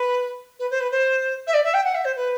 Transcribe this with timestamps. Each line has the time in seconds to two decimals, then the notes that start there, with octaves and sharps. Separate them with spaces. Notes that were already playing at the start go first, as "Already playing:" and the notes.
Already playing: B4
0.59 B4
0.71 C5
0.80 B4
0.91 C5
1.47 E5
1.54 D5
1.64 E5
1.74 G5
1.84 F#5
1.95 E5
2.05 C5
2.16 B4